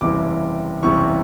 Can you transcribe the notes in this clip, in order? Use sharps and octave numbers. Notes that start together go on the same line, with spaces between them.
F#1 E2 C3 E3 G3 D6
F#1 E2 C3 E3 G3 C#6